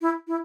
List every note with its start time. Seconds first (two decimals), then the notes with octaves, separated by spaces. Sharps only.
0.02 E4
0.28 E4